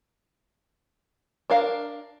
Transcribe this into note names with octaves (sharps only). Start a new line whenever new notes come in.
D4 A#4 F5